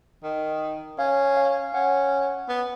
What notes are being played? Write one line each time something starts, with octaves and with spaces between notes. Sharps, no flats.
D#3
C#4 F5
F5
C#4 F#5
B3